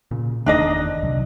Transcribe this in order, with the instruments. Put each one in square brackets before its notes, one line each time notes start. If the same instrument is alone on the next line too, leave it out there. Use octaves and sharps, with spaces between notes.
[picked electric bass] A#2 C#3
[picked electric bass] F#1 E2 D#3 [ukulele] D4 D#4 D#5
[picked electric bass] C#2 C3 F#3